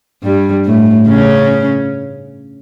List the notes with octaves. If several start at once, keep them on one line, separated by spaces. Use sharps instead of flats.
G2 G3
A2 A3
C#3 C#4